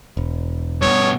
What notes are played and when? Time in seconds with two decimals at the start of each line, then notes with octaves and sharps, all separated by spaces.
0.17 E1
0.81 G2 B2 C#5